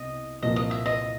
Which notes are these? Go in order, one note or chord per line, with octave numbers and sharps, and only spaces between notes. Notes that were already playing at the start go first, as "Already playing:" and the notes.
Already playing: C2 B2 C4 D#5
C2 A#2 F3 A#3 D#5
D#5
E5
D#5